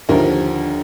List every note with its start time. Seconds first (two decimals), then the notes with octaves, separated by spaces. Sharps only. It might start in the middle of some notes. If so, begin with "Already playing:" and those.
0.09 D#2 D3 F3 A#4